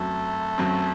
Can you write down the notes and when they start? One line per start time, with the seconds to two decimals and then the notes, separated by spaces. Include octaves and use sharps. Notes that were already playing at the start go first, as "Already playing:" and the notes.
Already playing: F#2 F#3 A3 C4
0.58 F#2 F#3 C4